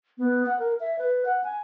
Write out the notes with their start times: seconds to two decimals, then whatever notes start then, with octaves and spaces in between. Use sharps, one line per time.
0.18 B3
0.46 F#5
0.59 A#4
0.80 E5
0.99 B4
1.25 F#5
1.44 G#5